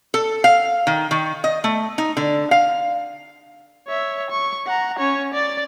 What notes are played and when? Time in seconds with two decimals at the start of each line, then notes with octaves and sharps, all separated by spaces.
0.14 A4
0.44 F5
0.87 D#3
1.11 D#3
1.44 D#5
1.64 A3
1.98 D#4
2.17 D3
2.51 F5
3.87 C#5 E5
4.30 C#6
4.67 F#5 A#5
4.99 C#4 C#5
5.34 D5 A6